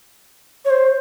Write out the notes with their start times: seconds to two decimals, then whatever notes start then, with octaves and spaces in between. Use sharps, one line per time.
0.65 C#5
0.70 C5